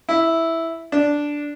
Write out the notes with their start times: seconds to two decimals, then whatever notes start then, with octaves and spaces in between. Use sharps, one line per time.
0.09 E4
0.92 D4